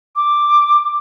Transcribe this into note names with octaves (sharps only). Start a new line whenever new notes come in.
D6